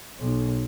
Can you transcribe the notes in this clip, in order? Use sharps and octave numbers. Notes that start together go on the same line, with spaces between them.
B1